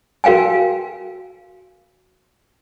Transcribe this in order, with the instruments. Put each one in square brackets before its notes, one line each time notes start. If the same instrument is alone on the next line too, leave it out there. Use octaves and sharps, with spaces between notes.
[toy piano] F#4 A#4 F5 G5 G#5